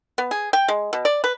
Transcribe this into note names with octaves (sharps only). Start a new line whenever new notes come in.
B3
G#4
G5
G#3
B2
D5
B4